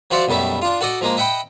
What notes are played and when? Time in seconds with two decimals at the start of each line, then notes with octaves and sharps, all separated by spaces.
0.11 F3 F#4 C5 D5 E5 F#5
0.28 B1 F#2 G3 A3 E5
0.62 D4 F4
0.81 F#4 A4 D5 D#5
1.01 F3 G#3 A#3
1.17 D#5 E5 F#5 G5 B5